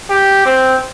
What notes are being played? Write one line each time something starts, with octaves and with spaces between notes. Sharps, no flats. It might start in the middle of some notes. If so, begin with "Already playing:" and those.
G4
C4